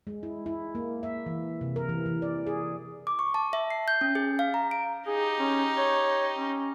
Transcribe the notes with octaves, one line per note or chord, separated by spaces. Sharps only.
G#3
E4
E4
A#3
E5
E3
C3
A#4
E3
E3
D5
G#4
D6
C#6
A5
E5
C7
G6
C#4
G#4
F5
A#5
D7
D#4 G4 G#4
C#4
C#5
C#4